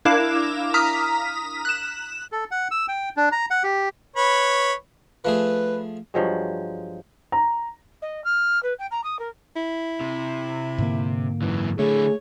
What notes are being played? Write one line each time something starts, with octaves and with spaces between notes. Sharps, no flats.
D4 E4 A#4 F5 D6 E7
A#5 D#6 F6 B6
F#6 E7
A4
F#5
E6
G5
D4
A#5
F#5
G4
B4 C#5 B5
F3 A3 G#4 B4
G2 F3 F#3 G#3
A#5
D#5
F6
B4
G5
A#5
D#6
A#4
E4
C3
G#2 D3 A#3
F#2 E3
D3 A3 E4 G#4 C#5